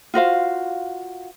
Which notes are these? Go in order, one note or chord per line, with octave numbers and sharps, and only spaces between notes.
F4 F#4 C5 F5